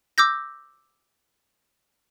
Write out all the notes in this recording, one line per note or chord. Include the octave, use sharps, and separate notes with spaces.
D6 E6 G6 A#6